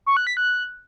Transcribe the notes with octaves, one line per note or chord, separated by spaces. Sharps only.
C#6
F#6
B6
F#6